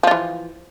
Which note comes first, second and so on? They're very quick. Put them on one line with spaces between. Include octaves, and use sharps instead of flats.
F3 F4 E3